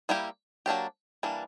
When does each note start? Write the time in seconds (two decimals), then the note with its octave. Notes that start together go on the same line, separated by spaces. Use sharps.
0.09 G3 A#3 E4 G4
0.66 F#3 A#3 D4 G4
1.23 E3 G3 A#3 D4